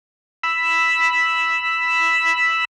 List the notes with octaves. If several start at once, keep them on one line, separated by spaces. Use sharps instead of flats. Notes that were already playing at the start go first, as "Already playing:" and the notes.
B5 E6